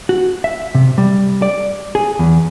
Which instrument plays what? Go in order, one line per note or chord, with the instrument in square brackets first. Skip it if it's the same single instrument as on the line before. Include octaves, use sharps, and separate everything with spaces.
[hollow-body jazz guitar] F#4
E5
C3
G3
D5
G#4
E2